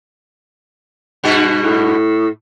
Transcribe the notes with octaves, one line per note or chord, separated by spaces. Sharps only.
G2 B2 F#4
A2